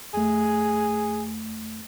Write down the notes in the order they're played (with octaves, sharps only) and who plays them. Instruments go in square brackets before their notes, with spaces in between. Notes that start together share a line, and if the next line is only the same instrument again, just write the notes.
[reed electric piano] F2 A3 [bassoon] G#4